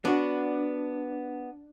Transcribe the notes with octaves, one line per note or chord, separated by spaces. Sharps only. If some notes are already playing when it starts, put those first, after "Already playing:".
B3 D4 F#4